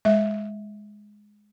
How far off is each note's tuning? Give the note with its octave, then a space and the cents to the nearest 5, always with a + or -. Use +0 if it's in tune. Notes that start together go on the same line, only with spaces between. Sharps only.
G#3 +0 E5 -25